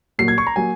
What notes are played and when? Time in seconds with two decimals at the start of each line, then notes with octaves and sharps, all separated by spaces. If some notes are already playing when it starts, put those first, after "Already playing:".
0.19 A#2 F#3 A#3 C7
0.28 G#6
0.38 C#6
0.47 A#5
0.56 F#3 A#3 G#5